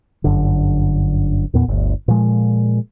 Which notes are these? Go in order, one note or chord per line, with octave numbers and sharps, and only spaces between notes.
G1 F#2 D3
E2 A#2 B3
G1 D2
A#2 F3 G#3